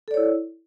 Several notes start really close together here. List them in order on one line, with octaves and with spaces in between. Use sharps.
A4 D5 C#5 E4